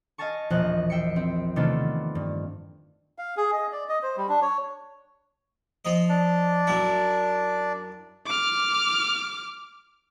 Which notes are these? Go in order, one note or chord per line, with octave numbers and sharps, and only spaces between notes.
D#5 F5 G#5 A5 C#6
E1 A#1 F3 D#5 F#6
E5 G5 C7 C#7
C4
C3 D#3 A3 B3 D4 F4
G2
F5
G#4
D#5
D5
D#5
C5
G3
D4
C#5
F3 D#5
D4 D5
F#2 E4
D6 F6